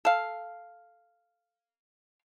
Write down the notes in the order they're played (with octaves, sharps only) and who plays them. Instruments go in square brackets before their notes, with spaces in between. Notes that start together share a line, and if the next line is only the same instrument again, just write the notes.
[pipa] A4 F5